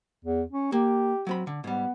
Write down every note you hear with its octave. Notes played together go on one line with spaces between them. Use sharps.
E2
C#4
A#3 G4
F#3 C4 B5
D3
G#2 G3 B3